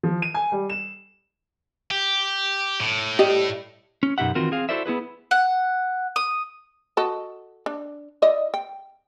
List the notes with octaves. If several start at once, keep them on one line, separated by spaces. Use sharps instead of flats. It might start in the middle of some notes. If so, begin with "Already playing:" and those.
F3
D#7
G#5
G3
E7
G4
A2
G3 G4 D#5
C#4
F#2 B2 D#4 G4 E5 F#5
D#3 E3 C4 F4 F#4 A#4
C4 G#4 F5
E4 F#4 A4 C5 D5 E5
B3 E4 G#4 B4
F#5
D#6
F#4 A4 D#5
D4
E4 D5 D#5
G5